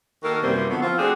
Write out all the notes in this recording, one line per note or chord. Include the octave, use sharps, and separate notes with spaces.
D#3 A#3 F#4 A4 A#4
F#2 C3 E3 G3 A#3 C5
D3 F3 F#3 B3
F3 C4 F4
A3 C4 D4 F#4 G#4